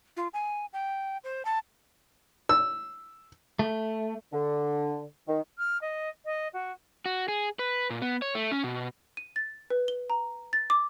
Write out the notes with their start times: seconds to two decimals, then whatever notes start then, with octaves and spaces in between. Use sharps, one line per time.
0.17 F4
0.34 G#5
0.73 G5
1.24 C5
1.45 A5
2.49 E6
3.59 A3
4.33 D3
5.28 D#3
5.58 F6
5.81 D#5
6.25 D#5
6.53 F#4
7.06 F#4
7.28 G#4
7.59 B4
7.90 A#2
8.02 B3
8.22 C#5
8.35 A3
8.52 C#4
8.64 B2
9.17 D#7
9.36 A6
9.70 B4
9.88 G7
10.10 A#5
10.53 A6
10.70 D6